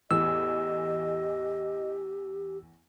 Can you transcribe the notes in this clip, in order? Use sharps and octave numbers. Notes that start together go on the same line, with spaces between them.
E2 A2 E3 G4 D#5 E6